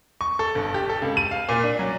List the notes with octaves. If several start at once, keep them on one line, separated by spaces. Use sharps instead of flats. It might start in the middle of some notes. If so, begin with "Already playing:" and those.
C#6
A4
G1
G4
A4
C#2
D#7
F5
A#2
D4
F#3